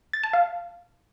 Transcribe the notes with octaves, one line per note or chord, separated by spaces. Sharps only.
A6
A5
F5